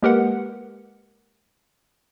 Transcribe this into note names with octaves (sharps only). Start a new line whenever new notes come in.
G#3 A#3 G4 A#4 B4 F#5